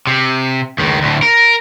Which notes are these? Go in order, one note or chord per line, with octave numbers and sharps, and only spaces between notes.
C3
C#2 D#3
D2 A2
A#4